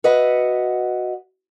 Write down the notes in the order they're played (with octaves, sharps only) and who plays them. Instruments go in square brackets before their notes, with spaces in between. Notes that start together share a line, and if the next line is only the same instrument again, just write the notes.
[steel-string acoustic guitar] F#4 B4 D#5 E5 F#5